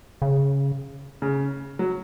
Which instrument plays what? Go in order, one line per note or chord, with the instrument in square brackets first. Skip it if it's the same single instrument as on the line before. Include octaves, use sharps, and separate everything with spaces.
[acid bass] C#3
[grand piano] C#3
F#3